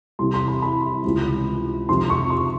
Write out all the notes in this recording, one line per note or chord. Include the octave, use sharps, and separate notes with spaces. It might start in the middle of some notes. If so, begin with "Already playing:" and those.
C2 C3 E3 C6
C6
B5
B5
C#2 C3 E3
F2 C3 D#3 C6
C#6
C6